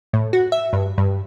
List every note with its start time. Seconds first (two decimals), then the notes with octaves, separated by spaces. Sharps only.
0.13 A2
0.33 F#4
0.52 E5
0.73 G2
0.98 G2